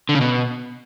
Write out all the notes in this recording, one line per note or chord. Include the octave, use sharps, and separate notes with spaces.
D3
C#3
B2